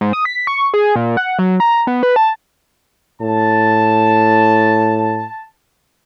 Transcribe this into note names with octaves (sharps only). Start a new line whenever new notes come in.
G#2
D#6
B6
C#6
G#4
A#2
F#5
F#3
A#5
B3
B4
A5
A2 A5